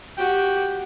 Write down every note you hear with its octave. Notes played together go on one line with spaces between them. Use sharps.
F#4 G4 G5